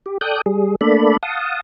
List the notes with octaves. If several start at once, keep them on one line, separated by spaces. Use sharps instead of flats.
G4
A4 D5 G5 D#6 F#6 G6
G3 G#4
A3 A#3 D4 A4 D5 B5
F5 F#5 A5 D#6